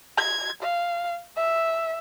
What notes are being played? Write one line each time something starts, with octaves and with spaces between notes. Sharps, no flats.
G#6
F5
E5